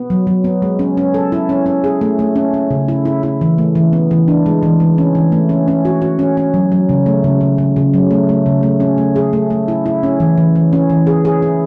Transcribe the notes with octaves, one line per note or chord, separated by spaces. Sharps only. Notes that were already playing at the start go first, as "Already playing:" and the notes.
Already playing: B3
F#3
F#3
B3
G#3
C#4
C#4
A4
E4
C#4
C#4
G#4
A3
A3
C#4
C#4
C#3
E4
E4
E4
E3
A3
E3
B3
E3
D4
G#3
E3
E3
C#4
E3
A3
C#4
C#4
F#4
F#4
C#4
C#4
F#3
F#3
C#3
A3
C#3
C#3
C#3
C#3
F#3
A3
A3
C#3
A3
C#4
A3
G#4
A3
A3
E4
E4
C#4
E3
E3
E3
C#4
E3
G#4
G#4
E4